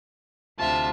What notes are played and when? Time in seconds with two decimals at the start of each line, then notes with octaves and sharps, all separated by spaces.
0.58 D2 C3 F4 E5 A5